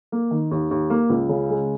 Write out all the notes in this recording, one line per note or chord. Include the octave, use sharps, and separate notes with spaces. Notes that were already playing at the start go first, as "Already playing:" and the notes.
A#3
D#3
D#2
D#2
A#3
C#2
C#3
G#3